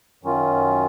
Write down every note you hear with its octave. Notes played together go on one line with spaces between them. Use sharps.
F#2 D#3 F#3 C#4 F4